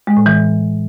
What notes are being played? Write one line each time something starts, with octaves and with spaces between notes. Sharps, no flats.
G#3
A2
E3